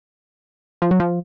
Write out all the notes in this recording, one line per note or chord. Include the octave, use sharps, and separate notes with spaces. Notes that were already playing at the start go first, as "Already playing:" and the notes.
F3
F#3
F3